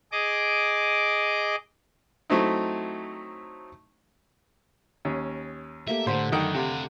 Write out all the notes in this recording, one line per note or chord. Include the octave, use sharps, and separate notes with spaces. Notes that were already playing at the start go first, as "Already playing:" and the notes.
G#4 D#5 D6
F#3 A3 C4 D#4 E4
D#2 C#4
A3 A#3 G4 E5
A2 D3 C5 B5
F#2 D#3 F#5 G5 D6
C3 G4 F5